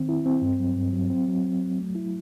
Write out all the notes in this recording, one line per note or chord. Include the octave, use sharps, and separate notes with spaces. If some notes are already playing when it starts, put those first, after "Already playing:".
Already playing: D#3 C4
E4
C4
G2
F#3
G2
F#3
C4
F#3
C4
F#3
A3
E4